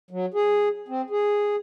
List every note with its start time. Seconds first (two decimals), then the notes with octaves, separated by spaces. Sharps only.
0.11 F#3
0.34 G#4
0.88 C4
1.10 G#4